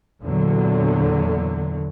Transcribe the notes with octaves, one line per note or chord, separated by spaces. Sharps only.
E2 A#2 D3 F#3